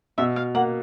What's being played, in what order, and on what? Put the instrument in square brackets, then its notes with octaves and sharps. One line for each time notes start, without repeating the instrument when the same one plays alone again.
[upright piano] B2 [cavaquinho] E5
[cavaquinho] F5
[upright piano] A#3 [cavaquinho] F#5